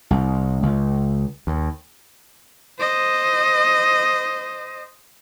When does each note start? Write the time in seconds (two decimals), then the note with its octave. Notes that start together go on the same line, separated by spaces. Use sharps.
0.11 C2
0.63 C#2
1.47 D#2
2.79 C5 D#5